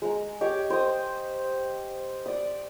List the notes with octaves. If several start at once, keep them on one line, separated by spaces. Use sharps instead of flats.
G#3 A#5
G4 C#5 D#5 D6
C5 D#6
D5 D#6